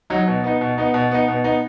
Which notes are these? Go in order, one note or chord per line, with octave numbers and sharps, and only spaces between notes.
F#3 D#4
B2
B3 D#4
B2
B3 D#4
B2
B3 D#4
B2
B3 D#4